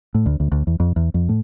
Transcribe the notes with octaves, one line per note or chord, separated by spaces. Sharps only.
A2
D2
D2
D2
E2
F2
E2
F2
A2